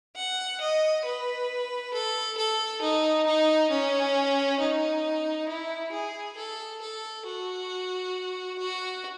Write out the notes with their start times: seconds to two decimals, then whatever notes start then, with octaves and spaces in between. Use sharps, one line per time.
0.16 F#5
0.61 D#5
1.05 B4
1.93 A4
2.37 A4
2.81 D#4
3.27 D#4
3.70 C#4
4.60 D#4
5.49 E4
5.92 G#4
6.37 A4
6.81 A4
7.26 F#4
8.59 F#4